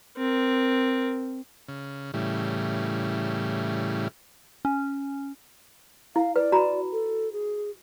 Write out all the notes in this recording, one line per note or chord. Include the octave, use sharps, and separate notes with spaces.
C4 A#4
C#3
A2 C#3 E3 G3
C#4
E4 F5
B4 D5
F#4 A#5 B5
A4
G#4